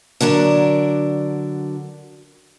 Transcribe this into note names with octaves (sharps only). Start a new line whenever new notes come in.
D3 F#3 D4 A#4